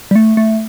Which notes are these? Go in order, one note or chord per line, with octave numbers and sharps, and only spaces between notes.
G3
A3
A3